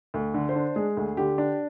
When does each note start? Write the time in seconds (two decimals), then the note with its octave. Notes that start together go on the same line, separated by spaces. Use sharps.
0.14 D2
0.34 D3
0.49 C5
0.56 D4
0.76 G#3 G#4
0.97 D2
1.17 D3 G4
1.38 D4